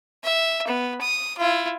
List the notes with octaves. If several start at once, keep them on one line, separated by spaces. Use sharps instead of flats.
E5
B3
D#6
E4 F4